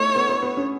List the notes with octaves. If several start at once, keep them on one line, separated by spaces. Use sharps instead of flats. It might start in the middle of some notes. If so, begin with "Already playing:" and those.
Already playing: A3 B3 D#4 E4 C#5
B3
B3
B3
C#4